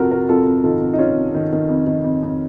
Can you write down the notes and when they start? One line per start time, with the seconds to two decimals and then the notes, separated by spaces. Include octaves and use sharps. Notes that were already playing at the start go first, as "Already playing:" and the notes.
Already playing: F2 C3 F4 F#4 A4 A#4
0.11 C3 F#4 A#4
0.29 F2 F4 A4
0.46 F2
0.63 D#3 F4 A4
0.81 F2
0.93 D#4
0.99 F2 C#4 F4
1.16 C3
1.34 D#3
1.52 D#3
1.69 F2
1.87 D#3
2.04 F2
2.23 F2